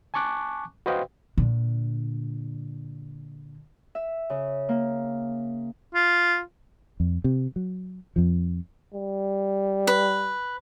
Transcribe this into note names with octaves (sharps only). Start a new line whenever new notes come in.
G#5 A5 C#6 D6 F#6
F#4 B4 C5 D#5 F5 G5
A#2 D3
E5
C#3
A#3
F4
F2
C3
F#3
F2 F3
G3
B4